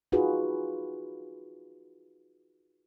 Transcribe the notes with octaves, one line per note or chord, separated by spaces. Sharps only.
D#4 F4 F#4 G#4 B4